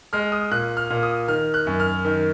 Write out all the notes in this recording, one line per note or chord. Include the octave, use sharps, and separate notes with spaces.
G#3 F6
D#6
A#2 F#6
F6
A#2
D#6
D#3 F6
F#6
F#2
F6
D#3